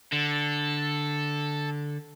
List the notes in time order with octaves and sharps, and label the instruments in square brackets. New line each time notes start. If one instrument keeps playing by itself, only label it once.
[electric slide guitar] D3 [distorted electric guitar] A4